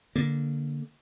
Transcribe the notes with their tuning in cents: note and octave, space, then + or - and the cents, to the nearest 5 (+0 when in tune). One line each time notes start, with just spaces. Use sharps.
D3 -10 A#3 +0